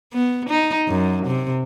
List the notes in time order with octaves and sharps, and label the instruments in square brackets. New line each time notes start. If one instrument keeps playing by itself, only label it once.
[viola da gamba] B3
D#4
F#2
C3